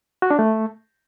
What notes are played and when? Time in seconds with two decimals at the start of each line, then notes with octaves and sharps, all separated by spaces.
0.22 F#4
0.31 D4
0.39 A3